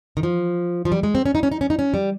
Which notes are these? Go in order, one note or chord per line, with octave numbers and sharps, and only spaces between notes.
D#3
F3
F3
G3
G#3
C4
C#4
D#4
C#4
D#4
C#4
D#4
C#4
G3